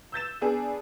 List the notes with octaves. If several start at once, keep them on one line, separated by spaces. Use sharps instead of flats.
E6 G6 A6 E7
B3 D4 G#4